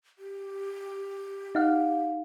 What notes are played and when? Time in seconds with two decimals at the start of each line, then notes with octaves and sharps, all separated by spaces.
0.18 G4
1.55 D#4 F5 F#5